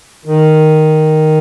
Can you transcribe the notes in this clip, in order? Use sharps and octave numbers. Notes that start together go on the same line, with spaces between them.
D#3